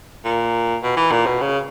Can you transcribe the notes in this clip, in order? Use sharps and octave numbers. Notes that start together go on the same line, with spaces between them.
A#2
B2
E3
A#2
B2
C#3